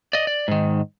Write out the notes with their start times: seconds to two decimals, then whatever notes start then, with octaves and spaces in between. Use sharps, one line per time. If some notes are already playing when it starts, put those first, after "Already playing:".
0.13 D5 D#5
0.27 D5
0.48 G#2 D#3